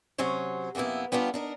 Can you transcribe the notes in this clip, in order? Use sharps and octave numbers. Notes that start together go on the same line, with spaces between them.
C3 F#3 C#4 C5 C#5
F#2 C3 A#3 B3 E4
G3 B3 C#4 D4 F4
D4 D#4 A#4